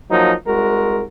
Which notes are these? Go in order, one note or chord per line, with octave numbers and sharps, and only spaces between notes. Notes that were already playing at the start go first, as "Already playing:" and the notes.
F3 F#3 A#3 D#4
C2 G#3 F#4 A#4